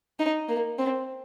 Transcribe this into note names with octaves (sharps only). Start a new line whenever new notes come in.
D#4
A#3
C4